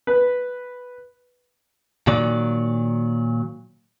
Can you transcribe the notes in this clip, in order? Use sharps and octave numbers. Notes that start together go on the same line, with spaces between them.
B4
A#2 D#3 F#3 D5